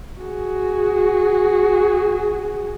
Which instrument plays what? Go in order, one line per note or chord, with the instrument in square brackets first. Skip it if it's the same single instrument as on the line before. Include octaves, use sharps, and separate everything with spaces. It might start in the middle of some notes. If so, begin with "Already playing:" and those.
[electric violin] F#4 G#4